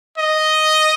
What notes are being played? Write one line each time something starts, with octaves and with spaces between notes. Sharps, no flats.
D#5